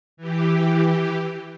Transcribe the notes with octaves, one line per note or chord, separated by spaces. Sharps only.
E3 G4